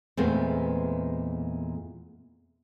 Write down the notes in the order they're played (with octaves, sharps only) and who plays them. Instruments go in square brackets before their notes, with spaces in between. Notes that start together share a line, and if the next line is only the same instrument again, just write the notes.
[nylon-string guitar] E2 A#2 G#3 A3 B3 C4